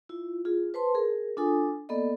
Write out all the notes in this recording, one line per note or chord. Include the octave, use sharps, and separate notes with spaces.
E4 F4
F4 G#4
B4 C5 A5 C6
G#4 A#4
D4 F4 A4 G#5 D#6
A#3 B3 A4 D5 D#5